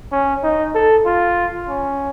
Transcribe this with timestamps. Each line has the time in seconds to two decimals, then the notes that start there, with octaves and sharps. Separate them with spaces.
0.12 C#4
0.43 D#4
0.74 A4
1.06 F4
1.69 C#4